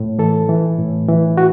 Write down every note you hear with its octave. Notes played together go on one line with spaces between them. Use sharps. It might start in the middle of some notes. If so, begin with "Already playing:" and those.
Already playing: A2
E3 A4
E3
A2
E3
F#4